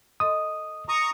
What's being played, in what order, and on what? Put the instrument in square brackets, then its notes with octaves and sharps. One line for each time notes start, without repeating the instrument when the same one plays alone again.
[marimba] A4 D#5 C6 [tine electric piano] D#6
[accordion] A#5 C#6 D#6